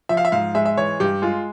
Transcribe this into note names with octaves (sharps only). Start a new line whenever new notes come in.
F3 E5
F5
E5
G#2 F5
G#3 E5
E5
E3 C#5
G2 G4
G#3 F4